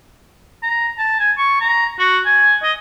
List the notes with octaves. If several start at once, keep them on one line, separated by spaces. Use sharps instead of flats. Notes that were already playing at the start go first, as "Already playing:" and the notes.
A#5
A5
G#5
C#6
A#5
F#4
G#5
D#5